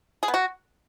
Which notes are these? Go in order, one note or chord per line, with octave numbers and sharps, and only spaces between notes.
G#4
B3
F#4